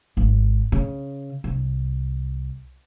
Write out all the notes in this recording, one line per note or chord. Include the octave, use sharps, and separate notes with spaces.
G#1
C#3
C2